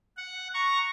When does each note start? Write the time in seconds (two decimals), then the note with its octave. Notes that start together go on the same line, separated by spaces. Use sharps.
0.17 F#5
0.54 A#5 C#6